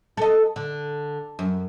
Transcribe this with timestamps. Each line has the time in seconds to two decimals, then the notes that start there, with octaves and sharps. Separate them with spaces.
0.17 A4 D#5
0.56 D3
1.39 F#2